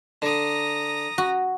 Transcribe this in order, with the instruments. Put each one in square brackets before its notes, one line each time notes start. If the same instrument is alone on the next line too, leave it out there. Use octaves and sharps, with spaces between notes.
[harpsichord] D3 [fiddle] A#5 D#6
[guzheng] F#4